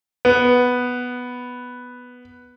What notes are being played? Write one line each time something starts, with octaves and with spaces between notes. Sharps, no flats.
B3